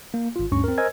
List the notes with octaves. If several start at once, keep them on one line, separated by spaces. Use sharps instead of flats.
A#3
G#1 F4
D2 G2 C#4 C#6
C4 A#4
A#4 C5 D#5 G#5 E6 G#6